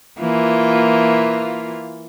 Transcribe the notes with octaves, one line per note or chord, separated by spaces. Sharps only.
E3 A#3 F4